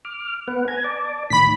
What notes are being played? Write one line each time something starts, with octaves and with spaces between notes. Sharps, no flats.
D6 F6
B3 B4 F#5
G#5 A#5 G#6
D5 A5 D6
A2 D#3 B5 B6